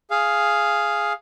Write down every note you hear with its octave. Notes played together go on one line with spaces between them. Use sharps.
G#4 F5